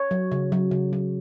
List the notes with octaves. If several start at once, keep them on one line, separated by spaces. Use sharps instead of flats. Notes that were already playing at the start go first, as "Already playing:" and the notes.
Already playing: C#5
F#3
C#3
F#3
C#3
F#3